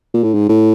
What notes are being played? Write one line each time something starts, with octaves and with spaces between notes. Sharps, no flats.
A#2
A2
G#2
A2